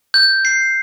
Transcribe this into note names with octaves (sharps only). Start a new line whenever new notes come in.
G6
C7